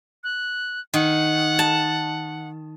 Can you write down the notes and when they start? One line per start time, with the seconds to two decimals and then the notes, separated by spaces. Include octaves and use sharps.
0.24 F#6
0.94 D#3 F#5
1.59 A5